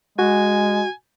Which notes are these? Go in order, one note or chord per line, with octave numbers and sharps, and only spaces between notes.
G#3 F#4 G#5